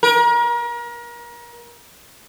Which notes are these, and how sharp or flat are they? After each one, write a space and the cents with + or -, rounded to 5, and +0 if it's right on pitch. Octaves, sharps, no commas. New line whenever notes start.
A#4 +35